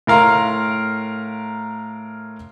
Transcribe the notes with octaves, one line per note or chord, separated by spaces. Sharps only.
A2 A#4 F5 A#5 C6